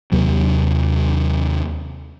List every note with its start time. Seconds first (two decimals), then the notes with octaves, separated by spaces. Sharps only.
0.12 D#2 C3 F#3